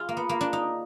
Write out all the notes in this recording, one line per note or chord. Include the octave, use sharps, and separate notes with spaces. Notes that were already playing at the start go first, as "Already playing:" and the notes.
Already playing: F4 G#4
A#3
B3
A#3
D4
D#4